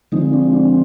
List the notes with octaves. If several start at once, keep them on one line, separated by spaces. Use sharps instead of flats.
D3 F3 G#3 C4 D#4
D4
D4